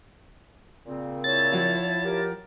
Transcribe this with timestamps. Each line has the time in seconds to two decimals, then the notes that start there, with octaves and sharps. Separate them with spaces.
0.86 A#2 C#3 C4
1.24 E4 C#5 A5 A6
1.52 F3 F4 F#4
2.04 G4 A#4